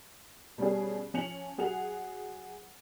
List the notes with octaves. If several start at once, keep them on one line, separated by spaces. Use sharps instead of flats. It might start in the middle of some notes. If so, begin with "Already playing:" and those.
B2 G3 C#4 G#4
F3 C#4 G#5 C#7 F7 F#7
F#3 G#4 F#5 F7